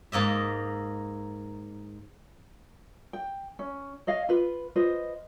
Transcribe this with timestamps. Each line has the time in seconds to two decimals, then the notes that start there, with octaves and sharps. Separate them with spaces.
0.12 G#2 A#3 D#5 E5
3.13 G5
3.59 C#4
4.07 C#5 D#5 F5
4.29 F4 B4
4.76 F4 B4 C5 D#5